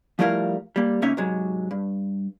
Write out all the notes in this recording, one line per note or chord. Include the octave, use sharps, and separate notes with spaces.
F3 G3 A3 E4 A#4 F5
G3 A#3
C#2 A#3 C#4 D#4 E5
G#2 C3 F#3 G#3
G2